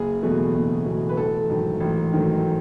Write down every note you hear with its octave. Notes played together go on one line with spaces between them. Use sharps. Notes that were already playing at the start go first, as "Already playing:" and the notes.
Already playing: F#1 G#4
E2 B2 F#3 A3
F#1
E2 B2 F#3 A3
B4
A1 A4
G#2 D#3 F#3 A3
A1
G#2 D#3 F#3 A3